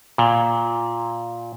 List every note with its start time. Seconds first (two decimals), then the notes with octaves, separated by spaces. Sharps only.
0.18 A#2